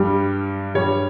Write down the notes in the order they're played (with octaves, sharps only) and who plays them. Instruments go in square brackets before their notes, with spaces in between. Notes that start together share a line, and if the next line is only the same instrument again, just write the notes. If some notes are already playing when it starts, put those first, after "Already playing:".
Already playing: [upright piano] G2 G3
G2 G3 C#5